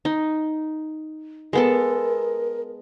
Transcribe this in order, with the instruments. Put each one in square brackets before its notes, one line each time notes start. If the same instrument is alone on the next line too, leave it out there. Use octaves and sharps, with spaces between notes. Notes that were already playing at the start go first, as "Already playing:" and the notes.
[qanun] D#4
[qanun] G#3 B3 A4 [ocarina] A#4